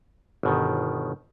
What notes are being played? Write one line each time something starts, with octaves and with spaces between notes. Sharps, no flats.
G1 B2 D#3